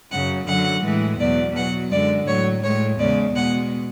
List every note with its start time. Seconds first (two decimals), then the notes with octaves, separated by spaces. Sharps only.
0.10 F#2 C#3 F#3 F#5
0.47 F#2 D3 F#3 F#5
0.83 A2 E3 G#3
1.19 E2 B2 F#3 D5
1.55 B2 F#3 F#5
1.91 F#2 D3 G#3 D5
2.27 A2 F#3 C#5
2.63 A2 G#3 C#5
2.99 E2 C#3 G#3 D5
3.35 B2 G#3 F#5